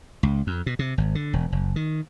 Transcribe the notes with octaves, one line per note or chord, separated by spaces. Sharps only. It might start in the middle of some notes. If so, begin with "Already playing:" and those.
C#2
F2
B2
C3
G#1
D3
E1
F#1
D#3